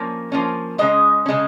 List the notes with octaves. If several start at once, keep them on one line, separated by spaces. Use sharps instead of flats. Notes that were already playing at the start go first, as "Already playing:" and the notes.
Already playing: F3 A#3 C#4
F3 A#3 C#4
C#3 G#3 C#4 D#5
C#3 G#3 C#4